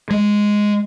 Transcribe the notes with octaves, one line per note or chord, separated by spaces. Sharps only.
G#3